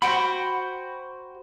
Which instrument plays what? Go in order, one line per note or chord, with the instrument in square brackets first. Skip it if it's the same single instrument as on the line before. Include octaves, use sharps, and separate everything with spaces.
[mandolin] F#4 C5 G5 [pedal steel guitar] B5